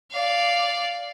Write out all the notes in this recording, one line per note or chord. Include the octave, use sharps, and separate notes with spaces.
D5 F5